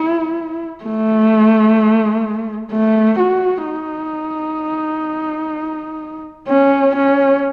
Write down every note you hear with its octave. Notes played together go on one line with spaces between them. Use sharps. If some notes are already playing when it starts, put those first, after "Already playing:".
Already playing: E4
A3
A3
F#4
D#4
C#4
C#4